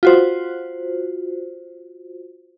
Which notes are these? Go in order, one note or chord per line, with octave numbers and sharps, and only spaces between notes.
F4 F#4 C5